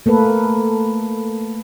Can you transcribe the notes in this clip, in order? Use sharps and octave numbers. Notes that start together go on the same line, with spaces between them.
A3 A#3 A4 B4